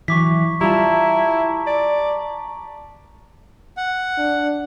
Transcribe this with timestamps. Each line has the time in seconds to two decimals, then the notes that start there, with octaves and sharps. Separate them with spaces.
0.08 E3 F#3 C#6 D6 B6
0.61 G3 E4 F4 A5 A#5
1.67 D5
3.77 F#5
4.18 D4